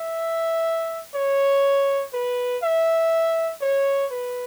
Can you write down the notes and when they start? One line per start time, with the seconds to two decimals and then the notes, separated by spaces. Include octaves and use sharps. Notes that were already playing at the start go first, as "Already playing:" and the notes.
Already playing: E5
1.15 C#5
2.14 B4
2.63 E5
3.62 C#5
4.11 B4